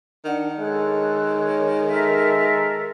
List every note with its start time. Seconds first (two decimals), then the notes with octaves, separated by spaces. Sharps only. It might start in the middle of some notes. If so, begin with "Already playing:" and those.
0.25 D#3 D4 F#5
0.59 G#3 A4 C#5 F#6
1.37 C#5
1.87 A4 A#4 E5